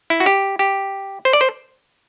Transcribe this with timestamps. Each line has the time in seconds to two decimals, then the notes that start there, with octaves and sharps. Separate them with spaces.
0.10 E4
0.20 F#4
0.26 G4
0.59 G4
1.25 C5
1.33 D5
1.41 C5